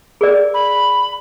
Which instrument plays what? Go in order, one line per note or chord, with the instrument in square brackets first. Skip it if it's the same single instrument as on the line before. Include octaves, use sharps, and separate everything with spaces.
[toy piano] G#4 A#4 D5
[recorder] B5